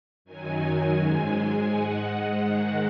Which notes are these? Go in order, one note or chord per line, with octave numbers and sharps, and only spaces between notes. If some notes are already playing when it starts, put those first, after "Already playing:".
F#2 D#3 F#3 G#5
G#2 G#3
G#2 G#3 F#5
G#2 D#3 G#3